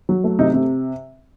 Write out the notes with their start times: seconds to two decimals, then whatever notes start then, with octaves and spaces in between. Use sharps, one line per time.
0.09 F#3
0.24 A3
0.39 C3 D#4
0.54 C3